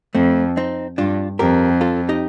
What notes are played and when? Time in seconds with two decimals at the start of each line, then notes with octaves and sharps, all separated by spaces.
0.15 F2 A3 C4
0.57 C4 D#4
0.98 G2 D4 F4
1.39 F2 G4 A#4
1.81 F4 A4
2.09 D#4 G4